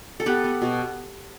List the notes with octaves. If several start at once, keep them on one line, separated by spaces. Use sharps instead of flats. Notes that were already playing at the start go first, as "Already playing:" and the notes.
A4
B3 G4 B4
B3
B2